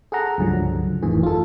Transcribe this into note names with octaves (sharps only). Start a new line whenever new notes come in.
G#4 A4 F#5 A#5
C#2 G2 D3 F3 F#3
C#3
G1 F2 A2 D#3 E3 G#4
F4 A4